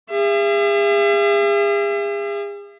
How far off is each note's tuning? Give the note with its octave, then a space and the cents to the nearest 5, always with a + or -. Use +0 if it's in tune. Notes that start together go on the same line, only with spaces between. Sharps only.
G#4 -40 E5 +40